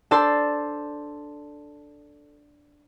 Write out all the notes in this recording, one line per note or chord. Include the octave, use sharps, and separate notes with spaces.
D4 A4 C5 A5 C6